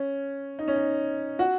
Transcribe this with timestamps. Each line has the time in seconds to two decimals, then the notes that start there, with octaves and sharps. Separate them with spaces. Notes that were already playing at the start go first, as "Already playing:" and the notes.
Already playing: C#4
0.59 D#4
0.68 C#4
0.76 D#4
1.39 F#4